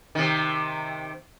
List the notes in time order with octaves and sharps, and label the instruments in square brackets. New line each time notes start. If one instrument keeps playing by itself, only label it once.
[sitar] C3 D#3